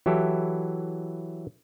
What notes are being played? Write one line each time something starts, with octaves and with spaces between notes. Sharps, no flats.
E3 F#3 E4 G4 A4